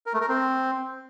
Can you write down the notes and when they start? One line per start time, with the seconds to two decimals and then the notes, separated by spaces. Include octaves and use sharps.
0.06 A#4
0.14 A3
0.21 A#4
0.29 C4